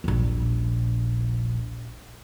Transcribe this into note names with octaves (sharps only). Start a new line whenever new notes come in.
D#1 A#1